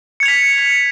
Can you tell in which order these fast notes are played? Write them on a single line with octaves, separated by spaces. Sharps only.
C#7 G#6 F7 B6